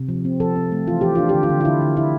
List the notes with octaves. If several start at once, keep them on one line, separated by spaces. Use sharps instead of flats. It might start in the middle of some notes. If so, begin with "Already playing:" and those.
Already playing: C3
F3
C4
F3 A4
C4
A3
E3 F4
E3 G4
D4 F4
G4
D3
F4
D3
F4
D3 E4
D3
D3 E4